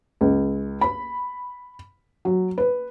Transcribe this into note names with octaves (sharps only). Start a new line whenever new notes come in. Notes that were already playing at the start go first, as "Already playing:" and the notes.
C#2
B5
F#3
B4